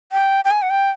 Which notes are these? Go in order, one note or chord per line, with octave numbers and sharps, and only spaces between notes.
G5
G5
G#5
F#5
G5